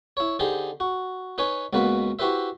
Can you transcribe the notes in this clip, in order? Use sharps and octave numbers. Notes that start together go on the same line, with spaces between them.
E4 C#5
D3 D#4 G4 G#4 C5
F#4
D#4 B4 C#5 G#5
C#2 B2 A#3 F#4 B4 B5
E4 F#4 G4 B4 C5 E5